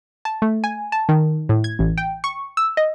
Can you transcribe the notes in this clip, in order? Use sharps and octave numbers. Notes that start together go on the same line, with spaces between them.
A5
A3
G#5
A5
D#3
A2
G#6
A1
G5
C#6
E6
D#5